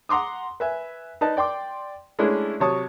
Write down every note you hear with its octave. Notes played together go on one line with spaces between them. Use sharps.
F#5 A#5 C6 D6 D#6
B4 E5 G#5
D#4 B4 D5 D#5 A5
D5 G5 C6 D6
G#3 A3 C#4 D4 E4
C3 F#3 C#5 A5 C#6 D#6